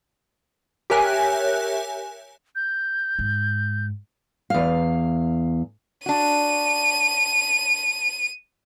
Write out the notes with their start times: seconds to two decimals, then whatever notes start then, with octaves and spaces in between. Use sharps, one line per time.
0.90 G4 A#4 C#5 E5 G#5 F#6
2.56 G6
3.19 G#2
4.50 E2 F5
6.06 D4 F#4 D#7